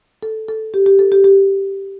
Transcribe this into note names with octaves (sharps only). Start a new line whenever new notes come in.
A4
A4
G4
G4
A4
G4
G4